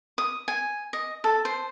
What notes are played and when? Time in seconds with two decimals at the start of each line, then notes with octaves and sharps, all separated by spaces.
0.18 D#6
0.48 G#5
0.93 D#5
1.24 A4
1.45 C5